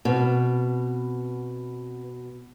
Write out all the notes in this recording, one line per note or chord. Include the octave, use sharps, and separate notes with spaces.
B2 C4 B4